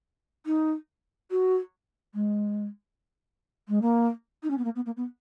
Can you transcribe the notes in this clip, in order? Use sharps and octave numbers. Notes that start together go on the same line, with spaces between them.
D#4
F#4
G#3
G#3
A#3
D#4
C#4
B3
A#3
B3
A#3
B3